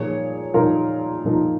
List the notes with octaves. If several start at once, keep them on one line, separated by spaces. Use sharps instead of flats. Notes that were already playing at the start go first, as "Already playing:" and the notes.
Already playing: A#2 F3 A#3 D#4 G#4 C#5
A#2 F3 A#3 D#4 F4 A#4
A#2 F3 A#3 D#4